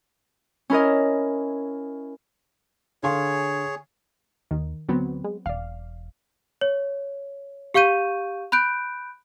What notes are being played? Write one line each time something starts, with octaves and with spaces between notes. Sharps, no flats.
C#4 E4 A#4 D#5
D3 G#4 C#5 F5 C6
D#2 D#3
D2 F#3 B3 C4
G#3
E1 D5 F5
C#5
G4 F5 C#6 G6 D#7
B5 F#6 G6 D7